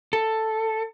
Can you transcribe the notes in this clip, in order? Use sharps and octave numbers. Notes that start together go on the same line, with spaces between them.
A4